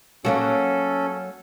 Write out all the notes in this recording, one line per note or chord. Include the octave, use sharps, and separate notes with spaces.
F#3 A#3 C#4 F#4 A4